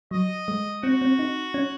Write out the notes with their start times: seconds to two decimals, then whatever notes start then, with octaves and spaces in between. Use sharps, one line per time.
0.11 F#3 D#5
0.48 G#3
0.83 C4 F#4
1.02 C4
1.19 D#4
1.54 C#4